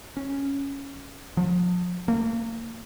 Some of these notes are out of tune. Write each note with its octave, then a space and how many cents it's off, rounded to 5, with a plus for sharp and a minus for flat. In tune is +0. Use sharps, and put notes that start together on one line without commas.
C#4 +0
F3 +35
A#3 -35